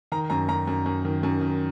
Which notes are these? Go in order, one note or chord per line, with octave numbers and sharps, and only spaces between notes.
D#3 A#5
F#2 A#5
F#2 A#5
F#2
F#2
D#3
F#2
D#3